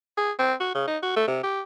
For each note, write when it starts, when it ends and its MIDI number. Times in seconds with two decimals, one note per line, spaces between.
0.17 0.32 68
0.39 0.54 60
0.60 0.70 66
0.75 0.87 49
0.87 0.97 63
1.02 1.16 66
1.16 1.26 57
1.28 1.42 48
1.43 1.61 67